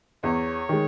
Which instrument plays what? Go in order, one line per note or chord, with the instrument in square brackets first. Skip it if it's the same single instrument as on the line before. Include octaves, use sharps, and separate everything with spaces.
[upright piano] E2 [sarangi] C#5
[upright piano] D#3 G#3